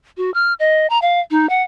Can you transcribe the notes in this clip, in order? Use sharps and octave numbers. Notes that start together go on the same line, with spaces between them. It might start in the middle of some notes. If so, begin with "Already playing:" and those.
F#4
F6
D#5
A#5
F5
D#4
F#5